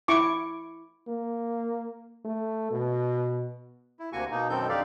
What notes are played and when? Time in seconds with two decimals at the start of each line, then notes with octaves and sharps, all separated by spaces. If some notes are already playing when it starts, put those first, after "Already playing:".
0.08 E4 C#6 D6
1.08 A#3
2.25 A3
2.71 B2
3.99 E4
4.13 D2 C3 A#3 F#4 G#5 C#6
4.31 B2 A#3 D#4
4.50 F#2 B2 D#3 C4 A4 G6
4.69 F2 D3 D#4 G4 D5 F5